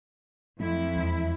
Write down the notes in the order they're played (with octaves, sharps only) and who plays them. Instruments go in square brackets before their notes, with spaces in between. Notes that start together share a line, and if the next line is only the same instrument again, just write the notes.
[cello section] F2 E4 [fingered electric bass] F#3 A3 C4
[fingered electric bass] E2 G#3